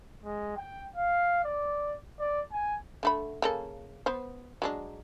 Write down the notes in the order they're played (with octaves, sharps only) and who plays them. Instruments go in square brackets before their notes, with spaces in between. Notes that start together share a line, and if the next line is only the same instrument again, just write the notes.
[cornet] G#3
G5
F5
D5
D5
G#5
[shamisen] D3 A3 B5
C#3 A#3 A4
B3 B4 C5
F#3 G#3 D4